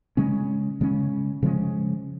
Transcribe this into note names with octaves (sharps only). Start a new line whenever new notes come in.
C#3 G#3 C#4
C#3 G#3 C#4
C#3 F3 G#3 C#4